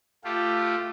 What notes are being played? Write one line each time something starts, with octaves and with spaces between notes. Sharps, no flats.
A3 F4 G4